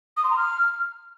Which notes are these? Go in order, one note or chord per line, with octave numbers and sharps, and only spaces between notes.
D#6
C6
A#5
F6